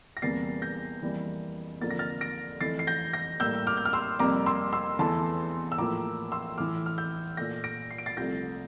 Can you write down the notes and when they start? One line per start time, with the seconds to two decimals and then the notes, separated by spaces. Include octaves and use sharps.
0.17 A#6
0.22 E2 C3 G3 A#3 A6 C7
0.62 G6 A#6
1.02 F2 E3 G3 A#3
1.81 F2 D3 F3 A#3 A6
1.91 A#6
1.99 F6 A6
2.21 A#6 D7
2.61 F2 E3 A3 A6 C7
2.79 C7
2.87 G6 A#6
3.13 G6 A#6
3.40 A2 G3 A#3 E6 G6
3.67 D6 F6
3.77 G6
3.85 F6
3.93 C6 E6
4.19 F2 C3 G3 A#3 A#5 D6
4.46 C6 E6
4.73 C6 E6
4.99 E2 E3 A3 A5 C6
5.72 E6
5.78 A2 F3 A#3 A#5 D6
6.32 C6 E6
6.58 A2 E3 A3 D6 F6
6.86 F6
6.98 E6 G6
7.37 A#2 A3 G6 A#6
7.64 A#6 D7
7.91 C7
7.98 D7
8.06 A6 C7
8.17 C2 C3 F3 A3 G6 A#6